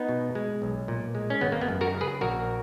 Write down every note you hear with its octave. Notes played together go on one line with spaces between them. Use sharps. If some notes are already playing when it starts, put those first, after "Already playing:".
Already playing: B3 D#4
B2
G#3
B1
A#2
G#3
C#4
G#1 B3
A#3
B3
F#2
F#4 A#4
C#3
G#4 B4
A#1 F#4 A#4